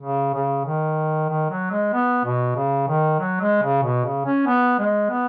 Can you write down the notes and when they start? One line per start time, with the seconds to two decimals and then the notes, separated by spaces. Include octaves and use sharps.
0.02 C#3
0.34 C#3
0.65 D#3
1.29 D#3
1.50 F#3
1.71 G#3
1.93 B3
2.24 B2
2.56 C#3
2.88 D#3
3.20 F#3
3.40 G#3
3.62 C#3
3.83 B2
4.05 C#3
4.25 C#4
4.46 B3
4.79 G#3
5.10 B3